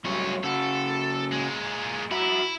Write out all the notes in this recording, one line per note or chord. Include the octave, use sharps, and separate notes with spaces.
G2 F#3 G#3 A3 C#5
C#3 F#4 A4
A#2 G#3
E4 F#4 E5 A#5